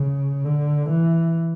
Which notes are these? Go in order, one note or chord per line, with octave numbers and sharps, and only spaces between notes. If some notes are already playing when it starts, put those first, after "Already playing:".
Already playing: C#3
D3
E3